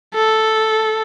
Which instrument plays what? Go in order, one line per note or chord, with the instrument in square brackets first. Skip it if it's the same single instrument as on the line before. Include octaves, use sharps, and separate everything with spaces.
[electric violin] A4